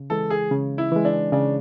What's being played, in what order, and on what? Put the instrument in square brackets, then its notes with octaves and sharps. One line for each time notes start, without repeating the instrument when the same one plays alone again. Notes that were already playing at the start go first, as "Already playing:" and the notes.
Already playing: [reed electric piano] C#3
[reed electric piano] E3 G#3 [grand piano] A4
[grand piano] G#4
[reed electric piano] C#3
[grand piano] E4
[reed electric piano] E3 G#3
[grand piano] D4
[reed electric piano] C#3 [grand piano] D4